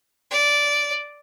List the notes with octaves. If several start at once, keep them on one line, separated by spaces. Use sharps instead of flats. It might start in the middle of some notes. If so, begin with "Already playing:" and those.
D5